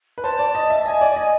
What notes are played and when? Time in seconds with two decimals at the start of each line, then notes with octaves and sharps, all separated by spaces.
0.18 B4
0.23 C5 A5
0.39 D5
0.55 D#5
0.70 E5
0.86 D#5 G#5
1.01 D5
1.16 D#5